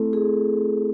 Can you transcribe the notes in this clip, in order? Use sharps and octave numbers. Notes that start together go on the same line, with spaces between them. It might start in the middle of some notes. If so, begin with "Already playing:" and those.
Already playing: A3 C4 E4 A4
G#4